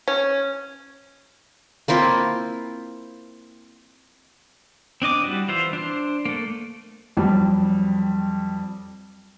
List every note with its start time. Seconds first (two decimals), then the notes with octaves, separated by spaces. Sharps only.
0.08 C#4
1.88 A#3 C4 E4 F4
5.02 C4 D4 D#5 D6
5.24 G3 E4 F#4
5.48 E3 F4 C5 E5
5.73 D4 C5
6.25 A3 A#3
7.17 F2 F#3 G3